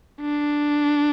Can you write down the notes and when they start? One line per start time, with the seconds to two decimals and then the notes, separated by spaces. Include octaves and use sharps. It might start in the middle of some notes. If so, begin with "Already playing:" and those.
0.21 D4